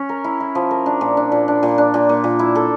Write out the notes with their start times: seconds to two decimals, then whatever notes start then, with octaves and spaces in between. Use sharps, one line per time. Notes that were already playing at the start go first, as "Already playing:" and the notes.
Already playing: C#4
0.09 A#4
0.24 E4
0.40 E4
0.55 F3
0.71 A#4
0.86 D4
1.01 A#2
1.17 D4
1.32 A#2
1.48 D4
1.63 A#2
1.78 D4
1.94 A#2
2.09 A#2
2.24 A#2
2.39 E4
2.55 A4